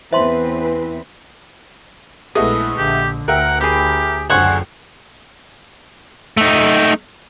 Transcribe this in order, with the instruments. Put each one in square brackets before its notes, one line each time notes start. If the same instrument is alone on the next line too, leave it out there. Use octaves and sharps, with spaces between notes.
[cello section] E2 C4 B4 [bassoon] E3 [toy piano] C5 C6 [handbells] E5
[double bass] A#1 E4 [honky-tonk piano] G#3 A3 B3 [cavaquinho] D#5
[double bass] A#1 D3 [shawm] G4
[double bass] D2 [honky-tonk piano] A#4 E5 G5 [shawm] F#5
[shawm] G4 [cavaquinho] G#4 B5
[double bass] F#1 F#2 [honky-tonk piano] C#2 D3 C5 [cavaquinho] F#5 G#5 C#6
[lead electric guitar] A3 D#4